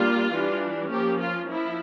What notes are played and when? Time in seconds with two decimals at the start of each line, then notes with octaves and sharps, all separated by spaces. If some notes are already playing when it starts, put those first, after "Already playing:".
Already playing: G3 A#3 D4 F4
0.32 E3 G3 D4
0.91 F3 A#3 C#4 G4
1.20 F4
1.49 F3 E4